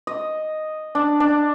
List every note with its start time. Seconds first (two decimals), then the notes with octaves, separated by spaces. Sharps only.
0.07 D#5
0.95 D4
1.20 D4